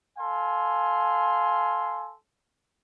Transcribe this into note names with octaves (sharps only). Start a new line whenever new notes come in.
A4 F5 G#5 C6